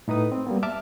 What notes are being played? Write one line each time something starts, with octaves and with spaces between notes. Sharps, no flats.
A2 D#4 B4 D#6
C4
G3 A#3 B3
E5 A5 D6 F6